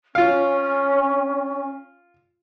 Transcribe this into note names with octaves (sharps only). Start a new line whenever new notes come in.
C#4 F4 F5